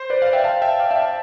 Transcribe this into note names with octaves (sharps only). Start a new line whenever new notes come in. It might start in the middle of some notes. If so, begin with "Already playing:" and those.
Already playing: C5
B4 D5
D5 F5
E5 G5
F5 A5
E5 G5
D5 F5
E5 G5
F5 A5